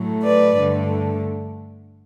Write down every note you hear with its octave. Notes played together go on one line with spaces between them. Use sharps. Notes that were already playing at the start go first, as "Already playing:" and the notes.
Already playing: A2 F#3 A3
B4 D5
G2 D3 A3